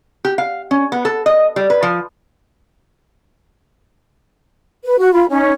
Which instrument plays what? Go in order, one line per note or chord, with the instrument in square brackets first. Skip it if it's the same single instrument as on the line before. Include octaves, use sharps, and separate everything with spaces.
[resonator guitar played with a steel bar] G4
F5
C#4
B3
A4
D#5
G3
B4
F3
[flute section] B4
F#4
F4 B5
C#4 D#4